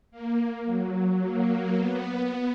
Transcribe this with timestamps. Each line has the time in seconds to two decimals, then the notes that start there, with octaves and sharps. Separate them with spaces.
0.11 A#3
0.66 F#3
1.21 A#3
1.76 B3